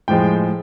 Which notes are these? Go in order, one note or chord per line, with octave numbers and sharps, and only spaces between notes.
A2 F3 G#3 G5